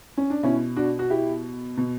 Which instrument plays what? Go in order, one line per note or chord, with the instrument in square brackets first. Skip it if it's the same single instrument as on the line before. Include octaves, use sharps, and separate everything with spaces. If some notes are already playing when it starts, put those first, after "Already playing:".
[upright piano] C#4
D4
B2 C#4 E4
D4 F#4
F#4
E4 G4
B2